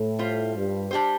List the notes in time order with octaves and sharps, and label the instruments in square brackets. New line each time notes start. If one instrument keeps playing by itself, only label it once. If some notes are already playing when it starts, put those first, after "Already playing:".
Already playing: [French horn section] A2
[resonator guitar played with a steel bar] G3 F4 C5
[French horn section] G2
[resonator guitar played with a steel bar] G3 D4 G4 C5